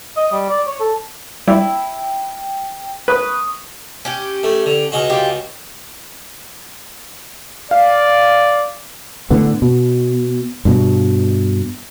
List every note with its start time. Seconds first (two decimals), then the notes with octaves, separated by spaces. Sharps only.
0.17 D#5
0.32 G3
0.49 D5
0.66 C#5
0.80 A4
1.48 G3 E4 G5
3.08 B4 C#6 D#6
4.05 C#4 G4
4.43 A3
4.66 D3
4.92 C#2 G#3 F#4
5.10 F4 G4
7.71 D5 F5
9.30 A2 D3 B3
9.62 B2
10.65 G2 B2